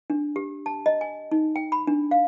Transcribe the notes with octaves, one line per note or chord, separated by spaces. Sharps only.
D4
G4
A5
D#5
G#5
D#4
G5
B5
D4
F5